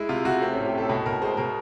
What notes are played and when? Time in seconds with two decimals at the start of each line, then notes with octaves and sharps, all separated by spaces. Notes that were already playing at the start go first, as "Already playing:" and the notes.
Already playing: G#3 E4
0.09 C3 F4
0.25 C3 F#4
0.41 A3 C4
0.54 A2 C#4
0.66 G4
0.73 A2 A4
0.89 B2 A4
1.06 B2 A#4
1.22 G#3 C5
1.37 B2 A#4